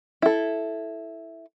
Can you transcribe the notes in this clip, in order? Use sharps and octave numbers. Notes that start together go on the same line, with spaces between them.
E4 A4